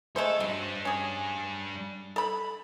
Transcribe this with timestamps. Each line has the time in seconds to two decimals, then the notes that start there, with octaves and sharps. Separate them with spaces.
0.16 G#3 A3 A4 C5
0.40 F#3 G3 D4
0.85 C#4 G#4
2.16 A4 B5